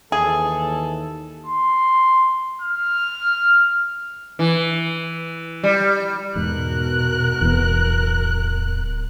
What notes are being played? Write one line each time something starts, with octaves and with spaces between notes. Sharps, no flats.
D#2 E3 G#4 A4
C6
F6
E3
G3
E2 G#2 B2 A#4 F#6
D1 E2 B3